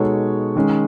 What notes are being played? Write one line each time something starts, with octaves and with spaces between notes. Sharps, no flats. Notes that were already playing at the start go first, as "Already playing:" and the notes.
Already playing: B2 G#3 D#4 A4 C#5
D#3 G#3 C#4